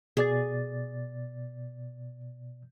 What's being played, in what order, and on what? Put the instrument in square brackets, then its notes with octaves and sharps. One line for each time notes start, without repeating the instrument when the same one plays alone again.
[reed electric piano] B2 D5 A6 [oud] G#4